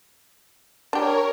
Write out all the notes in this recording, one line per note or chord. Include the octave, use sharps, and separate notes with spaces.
D4 G4 A#4 C#5